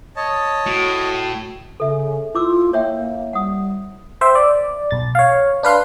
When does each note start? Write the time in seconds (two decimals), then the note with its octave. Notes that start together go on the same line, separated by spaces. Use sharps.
0.16 C#5 D#5 A5
0.66 A2 F#4
1.80 C#3 A4 E5
2.35 E4 F4 D6 E6
2.73 A#3 C#5 E5 G5
3.33 G3 F#5 D#6
4.21 C5 E5 G5
4.35 D5
4.91 B1 A6
5.15 C#5 F5
5.63 D4 B4 F5 C6